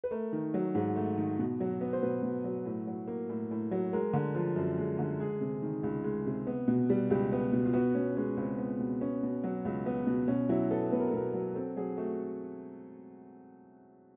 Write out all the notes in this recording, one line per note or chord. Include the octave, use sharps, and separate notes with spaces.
B4
A3 A#4
D#3
F#3
G#2
A3
D#3
B2
F#3
B3
C5
B2 B4
B2
F#3
A2
F#3
A#3
A2
A2
F#3
G#3 A#4
D3
F3
F#2
G#3
D3
G#3 G#4
C3
D#3
C#2
G#3
C3
B3
B2
G3
C#2 G4
B3
B2
F4
B3 F#4
B2 C#4
G#3 C#4
C#2 C4
B3
B2
B3 C#4
B2
F#3
C#2
B3
B2
B2 C#4
F#3 E4
B3 A4
B2 B4
A#4
A4
B2 A#4
F#3
C4 A4
F#3 G#4
A3 F#4